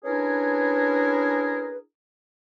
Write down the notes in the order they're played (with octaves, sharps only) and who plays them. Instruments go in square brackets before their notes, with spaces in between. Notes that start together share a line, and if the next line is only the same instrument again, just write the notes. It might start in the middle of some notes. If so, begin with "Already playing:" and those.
[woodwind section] C#4 D4 E4 G#4 A#4 B4